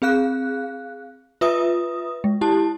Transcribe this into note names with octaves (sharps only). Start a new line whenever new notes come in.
C4 G#4 F5 F#6
F4 B4 E5 D#6
G#3
E4 G4 A5